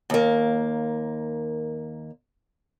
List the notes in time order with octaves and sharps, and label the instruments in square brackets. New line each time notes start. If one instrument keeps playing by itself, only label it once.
[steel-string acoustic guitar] D#2 A#3